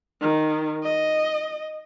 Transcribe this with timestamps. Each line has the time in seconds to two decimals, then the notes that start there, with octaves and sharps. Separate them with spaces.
0.22 D#3
0.84 D#5